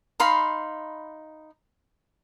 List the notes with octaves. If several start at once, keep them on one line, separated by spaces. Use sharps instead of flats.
D#4 F5 B5 C6